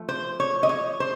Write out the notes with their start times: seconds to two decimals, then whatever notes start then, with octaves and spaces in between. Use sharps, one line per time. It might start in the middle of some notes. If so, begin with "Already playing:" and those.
Already playing: F3 A3
0.09 C5
0.40 C#5
0.63 D#5
0.69 C#5
1.00 C5